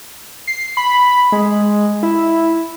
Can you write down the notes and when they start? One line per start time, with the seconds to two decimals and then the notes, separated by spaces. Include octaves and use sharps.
0.47 C7
0.77 B5
1.32 G#3
2.03 E4